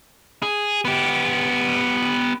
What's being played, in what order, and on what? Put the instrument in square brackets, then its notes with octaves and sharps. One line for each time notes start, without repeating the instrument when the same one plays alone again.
[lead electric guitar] G#4
B3 G4